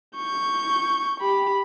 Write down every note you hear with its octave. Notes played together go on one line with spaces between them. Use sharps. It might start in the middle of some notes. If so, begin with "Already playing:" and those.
C#6 G6
G4 B5